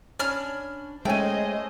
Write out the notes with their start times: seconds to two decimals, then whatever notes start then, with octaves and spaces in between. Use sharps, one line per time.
0.19 C#4 D4 B5 F6
1.05 G#3 A3 C#4 C5 D#5 G5 G#5